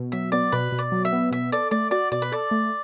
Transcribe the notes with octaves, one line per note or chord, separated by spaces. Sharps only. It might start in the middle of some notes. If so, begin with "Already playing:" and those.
Already playing: B2
F#3 E5
B3 D5
B2 B4
B2
D5
F#3
E5
B3
B2 E5
A4 D5
A3 D5
F#4 D5
B2 D5
B4
A4 D5
A3